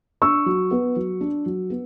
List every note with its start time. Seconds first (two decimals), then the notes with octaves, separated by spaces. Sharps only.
0.22 D4 C#6 E6
0.46 F#3
0.71 B3
0.96 F#3
1.21 D4
1.46 F#3
1.70 B3